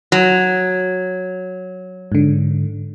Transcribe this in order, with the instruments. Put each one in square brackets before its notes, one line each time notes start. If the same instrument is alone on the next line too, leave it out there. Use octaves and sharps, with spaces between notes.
[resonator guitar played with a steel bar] F#3
[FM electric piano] G#2 D3